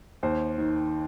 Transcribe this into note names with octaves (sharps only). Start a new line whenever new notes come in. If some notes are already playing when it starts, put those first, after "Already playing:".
D#2 C5
D#3